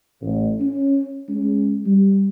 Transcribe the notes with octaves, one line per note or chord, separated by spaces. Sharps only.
A1
C#4
G#3 C#4
G3